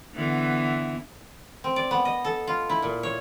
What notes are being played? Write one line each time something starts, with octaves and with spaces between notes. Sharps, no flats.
D3 E3 B3
C4
D5
B3
D#5
A4
F4
E4
A#2
C#5